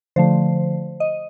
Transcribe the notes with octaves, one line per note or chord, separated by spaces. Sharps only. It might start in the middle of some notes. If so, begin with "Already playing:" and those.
D3 F3 A3 C5
D#5